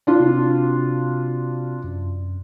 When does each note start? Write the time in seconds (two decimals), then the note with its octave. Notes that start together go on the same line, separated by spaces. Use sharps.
0.07 D4 F4
0.20 C3 C4 F#4
1.84 F#2